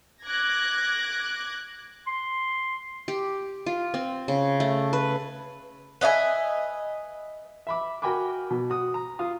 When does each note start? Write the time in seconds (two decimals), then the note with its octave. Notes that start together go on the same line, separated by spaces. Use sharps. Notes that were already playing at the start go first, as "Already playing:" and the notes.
0.23 D6 F#6 G#6 A#6
2.07 C6
3.08 G4
3.66 F4
3.94 C4
4.28 C#3
4.60 A3
4.93 B4
6.01 B4 D#5 E5 G#5
7.67 E5 B5 D6
8.02 F#4 A#4 G5 G#5 B5 D6
8.50 B2
8.70 F#4 D#6
8.94 A#5
9.19 F4 F5 D#6